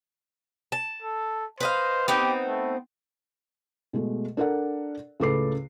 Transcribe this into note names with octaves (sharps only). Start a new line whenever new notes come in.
A5
A4
B4 C5 D#5 F5
B3 C4 D#4 G4
A3
B2 G#3 A3
D4 A4 A#4 D5 F#5
C#2 A2 A4 B4 D6 C7